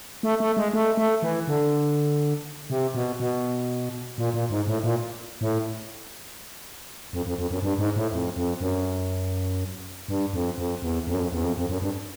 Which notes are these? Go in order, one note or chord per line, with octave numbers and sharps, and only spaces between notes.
A3
A3
G#3
A3
A3
E3
D3
C3
B2
B2
A#2
A#2
G#2
A2
A#2
A2
F2
F2
F2
F#2
G2
G#2
A2
F2
F2
F#2
G2
F2
F2
E2
F2
F#2
F2
E2
F2
F2
F#2
G2